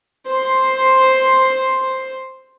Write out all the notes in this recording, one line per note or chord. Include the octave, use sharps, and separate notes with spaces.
C5 C6